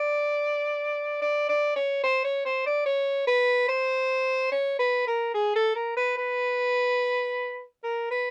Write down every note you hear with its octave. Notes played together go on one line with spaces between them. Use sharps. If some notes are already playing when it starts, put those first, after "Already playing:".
Already playing: D5
D5
D5
C#5
C5
C#5
C5
D5
C#5
B4
C5
C#5
B4
A#4
G#4
A4
A#4
B4
B4
A#4
B4